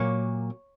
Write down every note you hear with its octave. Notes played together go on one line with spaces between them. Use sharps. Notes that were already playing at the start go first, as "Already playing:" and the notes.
Already playing: A#2 F#3 A#3 C#5